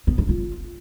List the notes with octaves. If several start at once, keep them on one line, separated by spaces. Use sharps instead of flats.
B3
D4
F4